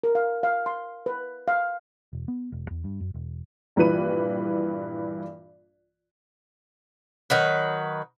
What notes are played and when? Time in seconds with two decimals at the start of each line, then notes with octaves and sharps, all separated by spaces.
0.03 A#4
0.15 F5
0.43 F5
0.66 C6
1.06 B4
1.48 F5
2.13 E1
2.28 B3
2.52 E1
2.71 E2
2.84 G2
3.01 F#2
3.14 E1
3.76 A#1 G2 E3 B4 D#7
7.30 D#3 F#3 B4